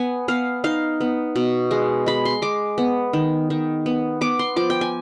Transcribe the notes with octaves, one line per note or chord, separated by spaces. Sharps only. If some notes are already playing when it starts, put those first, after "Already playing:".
Already playing: B3 G#5
B3 F5
D#4 F5
B3
B2
G#3
G#3 B5
C6
G#3 D6
B3
D#3
D#3
B3
B3 D6
C6
F3 D6
G5
G#5